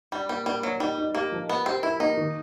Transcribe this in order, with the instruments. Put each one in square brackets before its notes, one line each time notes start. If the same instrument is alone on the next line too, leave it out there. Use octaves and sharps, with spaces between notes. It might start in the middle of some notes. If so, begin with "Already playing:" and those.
[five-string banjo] G3 [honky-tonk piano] D4
[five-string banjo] G3 [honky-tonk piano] A#3
[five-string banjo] G3 [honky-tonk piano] A#3
[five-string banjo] F#3 [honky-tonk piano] A#3
[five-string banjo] G3 [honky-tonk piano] D#4
[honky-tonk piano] D#4
[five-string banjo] A#3 [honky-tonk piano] G4
[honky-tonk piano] F3
[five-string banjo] B3 [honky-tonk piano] A#4
[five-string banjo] C4 [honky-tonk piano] G4
[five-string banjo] E4 [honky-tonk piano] A#4
[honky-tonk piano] A#3 [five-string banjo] D#4
[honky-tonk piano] D#3